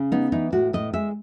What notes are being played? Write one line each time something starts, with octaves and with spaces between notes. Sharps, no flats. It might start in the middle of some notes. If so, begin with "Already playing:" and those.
Already playing: C#3
B3 D#4
E3 D#4
A2 F#4
A2 D#5
G#3 E5